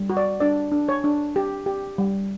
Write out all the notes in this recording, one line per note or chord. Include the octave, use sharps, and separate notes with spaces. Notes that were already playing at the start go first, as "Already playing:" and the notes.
Already playing: G3
F#4
D5
D4 D5
D4
C#5
D4
G4
G4
G3